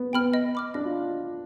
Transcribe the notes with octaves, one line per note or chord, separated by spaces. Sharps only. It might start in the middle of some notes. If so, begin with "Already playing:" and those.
Already playing: B3
B3 G5 B5 F6
D#5
B5 D6 F6
D4 D#5
F4